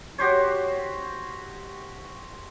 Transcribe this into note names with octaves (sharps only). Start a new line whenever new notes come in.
F#4 G4 C5 C#5